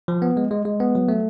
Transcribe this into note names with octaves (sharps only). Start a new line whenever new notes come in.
F3
B3
G#3
G#3
G#3
B3
F#3
A3